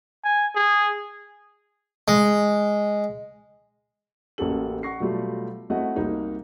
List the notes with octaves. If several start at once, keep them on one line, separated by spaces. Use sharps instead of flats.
G#5
G#4
G#3
A1 A#3 C#4 F#4 A4 F#7
F#5 C#6 A#6 C7
B2 F#3 G3 A3 F4
A3 C4 E4 F#4 D#5 F#5
C2 A#3 D#4 F#4